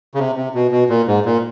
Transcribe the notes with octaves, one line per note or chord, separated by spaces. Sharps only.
C#3
C3
C3
B2
B2
A#2
G#2
A#2